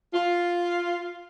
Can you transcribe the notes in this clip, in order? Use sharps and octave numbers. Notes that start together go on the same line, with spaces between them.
F4